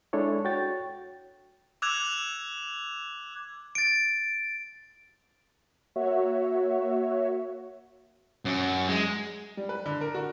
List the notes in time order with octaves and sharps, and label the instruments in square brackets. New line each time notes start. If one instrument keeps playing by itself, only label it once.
[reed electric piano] G#3 D4 E4 A4 C#5
F#4 C#5 G5 A6
[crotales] D6 E6 F#6 G#6 F7
[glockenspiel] A6 D7
[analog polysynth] A#3 F#4 C#5 E5
[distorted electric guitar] F#2
G#3
[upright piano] G3
B4
D3
A#4
F#4